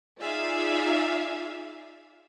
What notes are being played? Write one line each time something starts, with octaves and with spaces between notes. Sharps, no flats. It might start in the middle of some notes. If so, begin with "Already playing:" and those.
D#4 F4 G#4 D5 E5 F5